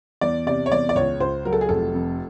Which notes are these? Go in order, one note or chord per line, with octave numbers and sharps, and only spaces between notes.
E2 D5
C3 D5
C#5
E2 D5
D5
C#2 C#5
C#2 C5
F#3 A#4
A4
G#4
F1 A4
F2